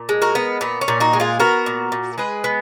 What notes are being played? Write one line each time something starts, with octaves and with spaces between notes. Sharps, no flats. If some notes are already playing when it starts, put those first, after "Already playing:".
Already playing: A#2
G#3
F#4 A#4
B3
A#2 B3
C#4
A#2
D#4 F#4
G#3
F4 G#4
B3 F#4 A#4
A#2
A#2
G#3 G#4 B4
B3